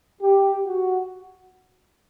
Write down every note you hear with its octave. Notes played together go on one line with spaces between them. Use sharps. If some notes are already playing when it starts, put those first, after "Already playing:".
G4
F#4